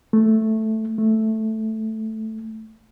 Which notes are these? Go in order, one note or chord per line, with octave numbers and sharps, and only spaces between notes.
A3
A3